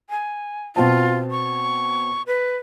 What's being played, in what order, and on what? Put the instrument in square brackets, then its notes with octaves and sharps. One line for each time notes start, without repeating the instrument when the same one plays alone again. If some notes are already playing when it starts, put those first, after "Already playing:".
[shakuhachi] G#5
[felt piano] B2 C4 A5 [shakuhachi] F4
[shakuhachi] C#6
B4